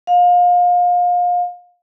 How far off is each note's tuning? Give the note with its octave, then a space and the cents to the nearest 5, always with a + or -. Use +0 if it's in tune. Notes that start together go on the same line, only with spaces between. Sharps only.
F5 +30